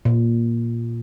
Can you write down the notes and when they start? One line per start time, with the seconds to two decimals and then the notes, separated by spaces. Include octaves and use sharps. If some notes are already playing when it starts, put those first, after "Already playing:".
0.05 A#2